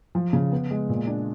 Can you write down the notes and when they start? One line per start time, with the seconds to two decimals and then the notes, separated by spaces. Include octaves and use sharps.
0.15 F3
0.33 C#3
0.52 B3
0.71 G#3
0.89 A#2
1.07 D4